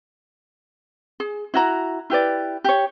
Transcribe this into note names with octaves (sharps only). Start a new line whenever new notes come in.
G#4
E4 F#4 A#5
E4 G4 B4 D5
G4 C#5